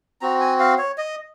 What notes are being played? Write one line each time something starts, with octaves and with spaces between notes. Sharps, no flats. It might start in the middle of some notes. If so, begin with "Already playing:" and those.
C4 F#4 A#5
G#5
F5
C#5
D#5